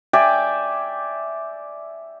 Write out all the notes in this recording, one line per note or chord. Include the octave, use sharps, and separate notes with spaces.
D5 E5 G5 G#5